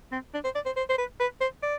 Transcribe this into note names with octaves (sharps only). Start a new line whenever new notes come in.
C4
D4
C5
D5
C5
C5
C5
B4
B4
C5
D5